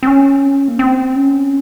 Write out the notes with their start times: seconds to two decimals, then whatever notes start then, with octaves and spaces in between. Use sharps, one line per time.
0.03 C4
0.07 C#4
0.68 A#3
0.79 C4
1.16 C#4